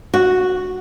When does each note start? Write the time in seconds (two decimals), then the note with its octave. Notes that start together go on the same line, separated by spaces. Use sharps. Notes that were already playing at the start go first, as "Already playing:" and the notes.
0.14 F#4